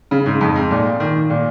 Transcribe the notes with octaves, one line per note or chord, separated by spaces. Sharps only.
C#3
G#2
F2
G#2
A#2
D#3
A#2